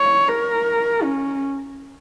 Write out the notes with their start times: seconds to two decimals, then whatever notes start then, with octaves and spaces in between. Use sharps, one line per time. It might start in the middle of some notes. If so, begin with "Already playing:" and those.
Already playing: C#5
0.29 A#4
1.03 C#4